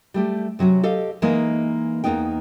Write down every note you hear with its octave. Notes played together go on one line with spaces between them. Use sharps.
G3 A3 G4
C3 F#3 C#4 F#4
G4 A4 D#5 F5
E3 G#3 A#3 D#4
E2 A#2 A#3 B3 D#4 G5